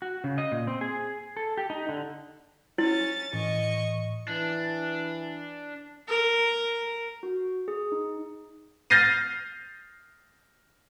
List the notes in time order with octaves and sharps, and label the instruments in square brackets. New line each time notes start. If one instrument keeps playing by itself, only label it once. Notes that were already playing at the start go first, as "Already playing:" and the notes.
[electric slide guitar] F#4
C#3
D#5
A#2
C4
G#4
A4
G4
D#4
D3
[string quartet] C#4 A6 [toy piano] E4
[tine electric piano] A2 E3 [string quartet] D#5 C#6
[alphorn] E3 [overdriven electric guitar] D4
[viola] A#4
[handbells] F#4
G#4
D#4
[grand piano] F6 G6 A6 A#6 C7 D#7